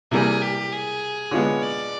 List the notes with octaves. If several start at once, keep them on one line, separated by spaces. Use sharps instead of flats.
C3 E3 G3 A#3 G#4
G4
G#4
D3 F3 G#3 B3 C#5
D5